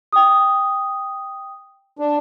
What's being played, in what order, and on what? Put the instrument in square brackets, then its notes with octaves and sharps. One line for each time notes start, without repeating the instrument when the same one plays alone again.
[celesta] G5 D#6
[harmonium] D4